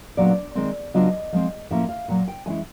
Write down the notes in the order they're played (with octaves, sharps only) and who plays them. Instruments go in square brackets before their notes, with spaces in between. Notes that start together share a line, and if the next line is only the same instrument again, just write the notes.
[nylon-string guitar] A#2 F#3 B3 D4 D5
D#3 G#3 C4
C#3 F#3 B3 D4 F4 D#5
F3 G#3 C4
A2 F3 A#3 C#4 E4 E5
F5
A#2 F#3 A#3 F#5
G5
E3 G#3 C#4 E4 G#5